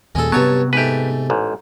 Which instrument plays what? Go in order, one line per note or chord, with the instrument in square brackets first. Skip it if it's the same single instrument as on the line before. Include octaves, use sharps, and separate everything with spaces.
[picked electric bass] D#2 A#2 [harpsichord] G#3 A4
[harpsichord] G2 C#5 A5 [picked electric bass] C3 B3 [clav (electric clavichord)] F#3
[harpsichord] G#2 A3 [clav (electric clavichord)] G4 B4
[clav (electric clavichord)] A1 G#2